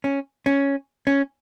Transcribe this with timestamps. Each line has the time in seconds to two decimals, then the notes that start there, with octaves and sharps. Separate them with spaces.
0.04 C#4
0.46 C#4
1.07 C#4